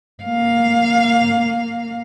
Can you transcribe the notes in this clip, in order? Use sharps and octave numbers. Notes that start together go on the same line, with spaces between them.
A#3 F5